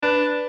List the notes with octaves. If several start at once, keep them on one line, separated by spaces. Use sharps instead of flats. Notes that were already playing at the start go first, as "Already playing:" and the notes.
D4 B4